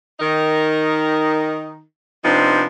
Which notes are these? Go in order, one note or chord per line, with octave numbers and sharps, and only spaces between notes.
D#3 D#4 A#4
C3 F3 B3 C4 D4 D#4